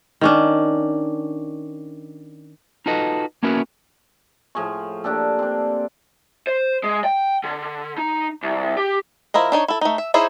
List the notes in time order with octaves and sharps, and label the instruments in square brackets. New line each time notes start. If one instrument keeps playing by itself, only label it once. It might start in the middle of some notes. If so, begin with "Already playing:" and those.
[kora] D#3 C#4 D4
[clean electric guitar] D#4 F4 F#4 A4 B4 D#5
A#3 B3 C#4 E4 F#4 A#4
[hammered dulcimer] A2 F3 G#4 C#6
A#3 D4 G4 A4
C4 D4
[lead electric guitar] C5
G#3
G5
D3
D#4
C2
G4
[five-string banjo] F3 E4 A#4 D#5
D4 D#4 C#5
E4 A4
A3 D#4
E5
D#4 E4 G#4 C5 C#5